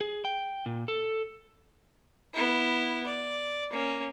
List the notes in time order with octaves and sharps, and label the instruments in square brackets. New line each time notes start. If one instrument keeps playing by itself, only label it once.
[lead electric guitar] G#4
G5
A#2
A4
[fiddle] B3 E4
D5
A#3 C#4